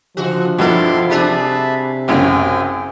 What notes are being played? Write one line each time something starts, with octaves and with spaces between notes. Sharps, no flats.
C#3 F3 F#4
G2 B2 E3 E4 A4 C6 D6
C3 A3 D4 G#4 E5 A5 B5
A1 F#2 C#3 C4 G5 G#5